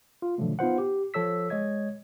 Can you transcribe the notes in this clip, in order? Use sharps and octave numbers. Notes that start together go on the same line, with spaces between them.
F4
B2 D3 D#3 F3 F#3 A3
B3 D#4 F4 C5 F#5
G4
F3 A4 C#5 E6 B6
G#3 C#5 D#5 G#6